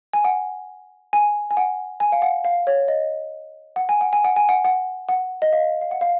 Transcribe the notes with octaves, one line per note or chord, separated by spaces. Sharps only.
G#5
F#5
G#5
G#5
F#5
G#5
F5
F#5
F5
C#5
D#5
F#5
G#5
F#5
G#5
F#5
G#5
F#5
F#5
F#5
D#5
F5
F5
F#5
F5